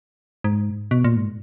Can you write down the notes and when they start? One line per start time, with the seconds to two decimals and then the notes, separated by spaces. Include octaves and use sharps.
0.44 G#2
0.91 B2
1.04 A#2
1.16 G#2